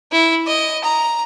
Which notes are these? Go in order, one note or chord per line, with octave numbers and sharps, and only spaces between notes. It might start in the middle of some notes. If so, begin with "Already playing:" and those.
E4
D#5
A#5